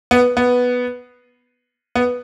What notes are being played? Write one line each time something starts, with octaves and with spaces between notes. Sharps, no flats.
B3
B3
B3